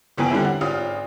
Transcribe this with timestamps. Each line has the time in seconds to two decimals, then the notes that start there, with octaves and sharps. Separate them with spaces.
0.18 F#1 E2 B3 G5 G#5
0.30 D3 G3 C4 C#4 E4
0.45 F#5
0.61 G#1 C#4 F4 D#6 F6